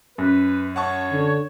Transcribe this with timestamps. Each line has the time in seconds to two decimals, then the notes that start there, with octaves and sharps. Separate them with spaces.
0.18 F#2 B4
0.76 C#5 F#5 A5 C#6
1.12 D3